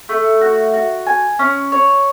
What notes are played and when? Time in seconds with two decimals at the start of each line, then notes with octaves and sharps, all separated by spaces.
0.09 A3
0.41 F#4
0.73 F#4
1.07 G#5
1.39 C#4
1.72 C#5